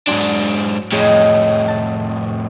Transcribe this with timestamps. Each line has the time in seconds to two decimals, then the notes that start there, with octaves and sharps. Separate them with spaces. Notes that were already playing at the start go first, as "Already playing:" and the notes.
0.08 G#2 F#3 D4 G#5 C6
0.92 F2 A2 G#4 C#5 D#5
1.68 A5